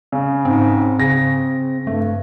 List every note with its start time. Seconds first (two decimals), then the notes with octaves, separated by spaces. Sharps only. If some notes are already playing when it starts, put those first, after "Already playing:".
0.12 C#3
0.45 G#2 C4
1.00 C#3 A#6
1.87 G2 A3